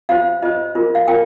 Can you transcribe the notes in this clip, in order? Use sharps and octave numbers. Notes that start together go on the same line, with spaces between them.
F4 C5 F5
F4 C5 D#5
F4 A#4
F5
F4 A#4 G5